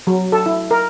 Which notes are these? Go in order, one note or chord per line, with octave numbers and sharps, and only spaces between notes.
F#3
A4
E4
A#4